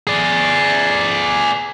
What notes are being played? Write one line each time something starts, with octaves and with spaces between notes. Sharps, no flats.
G#4 D5